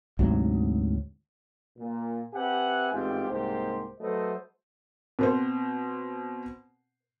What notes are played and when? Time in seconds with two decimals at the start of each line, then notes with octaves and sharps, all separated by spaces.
0.19 D2 G#2 C3 F#3
1.78 A#2
2.34 C4 G4 B4 E5 F#5 G#5
2.92 A1 G#2 C4 F4 G4
3.29 C2 G#2 A#3 G4 C5
4.01 F#3 A3 A4 B4 C5 D#5
5.19 B2 C4 C5